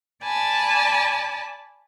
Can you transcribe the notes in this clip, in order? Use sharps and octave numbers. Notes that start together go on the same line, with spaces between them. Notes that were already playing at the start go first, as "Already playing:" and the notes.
D5 G#5 A5 B5